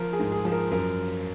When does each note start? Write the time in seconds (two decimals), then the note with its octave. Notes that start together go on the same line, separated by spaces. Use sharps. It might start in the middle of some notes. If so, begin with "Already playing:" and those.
Already playing: F3 A#4
0.13 G#4
0.20 G#2
0.32 G#4
0.45 F3
0.52 A#4
0.71 F#2 A#4